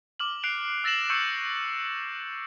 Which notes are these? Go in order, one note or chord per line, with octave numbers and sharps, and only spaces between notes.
D6 F6 F#7
F#6 C7 D7 F7 F#7
E6 A6 A#6 C7 E7 F#7
C#6 E6 G6 C7 C#7